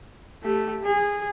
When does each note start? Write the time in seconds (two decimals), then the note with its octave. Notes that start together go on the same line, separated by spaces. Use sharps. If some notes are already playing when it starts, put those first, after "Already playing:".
0.43 A3 G4
0.84 G#4